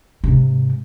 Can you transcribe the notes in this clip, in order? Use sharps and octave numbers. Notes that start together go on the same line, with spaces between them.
G#2 C3